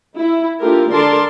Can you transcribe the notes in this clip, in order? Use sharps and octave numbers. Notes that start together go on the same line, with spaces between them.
E4
A#3 D4 F4 G4 A4 A#4
D3 A4 A#4 D5 A5 C6